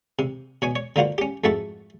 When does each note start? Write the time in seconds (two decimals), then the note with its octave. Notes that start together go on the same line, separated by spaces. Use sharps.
0.19 C3
0.62 B2 C#5 G#5
0.76 C#5
0.96 D3 A#3 F4 F#4 C5
1.18 C#4 G4
1.44 F2 G#2 A3 F#4 A4 A5